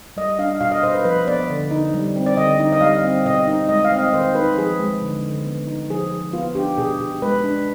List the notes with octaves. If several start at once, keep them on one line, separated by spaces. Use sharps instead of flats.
G3 D#5
D4 F5
B2 F5
D#5
B2 C5
B4
F3 B4
B3 D5
D3
D#4
G3
C4
D5
D3 D#5
D#4
D#5
G3 F5
C4
B2 D#5
D#4
G#3 D#5
F5
C4
D#5
D#3 C5
D#4 B4
F3 G#4
G#3
D3
D3
B3
D#4
F3 G#4
F3
B3 F4
D4 G4
B2 G#4
B2
G#3 B4
D4